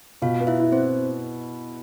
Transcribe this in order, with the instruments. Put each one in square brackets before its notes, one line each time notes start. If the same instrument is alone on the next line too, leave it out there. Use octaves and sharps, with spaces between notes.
[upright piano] B2 [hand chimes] F4 F5
[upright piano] B3
[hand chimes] E4 E5
[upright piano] E4
[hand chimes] C4 C5